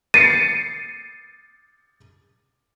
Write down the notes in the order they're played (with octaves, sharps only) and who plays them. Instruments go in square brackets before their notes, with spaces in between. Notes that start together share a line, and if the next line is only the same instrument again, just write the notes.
[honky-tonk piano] A6 C7 C#7 [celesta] D#7